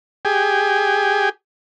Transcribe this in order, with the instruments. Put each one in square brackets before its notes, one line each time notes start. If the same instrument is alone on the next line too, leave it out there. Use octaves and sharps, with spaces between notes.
[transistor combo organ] G4 G#4